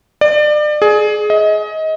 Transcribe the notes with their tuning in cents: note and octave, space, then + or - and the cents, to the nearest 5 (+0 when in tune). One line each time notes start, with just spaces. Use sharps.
D5 +30
G#4 +20
D#5 +25